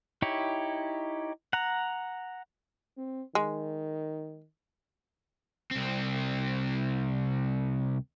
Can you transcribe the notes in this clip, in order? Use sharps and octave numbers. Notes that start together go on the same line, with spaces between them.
D#4 E4 G4 C#5
F#5 A#5
C4
D#3 G#3
C2 C4